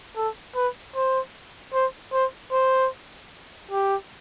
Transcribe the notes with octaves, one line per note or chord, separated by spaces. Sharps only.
A4
B4
C5
C5
C5
C5
G4